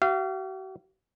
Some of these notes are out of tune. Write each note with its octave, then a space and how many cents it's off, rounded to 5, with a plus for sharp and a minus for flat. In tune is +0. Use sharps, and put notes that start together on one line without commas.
F#4 +45 F5 -30